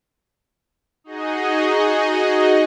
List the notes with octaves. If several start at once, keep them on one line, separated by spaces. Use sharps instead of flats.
D#4 F#4 G#4 D#5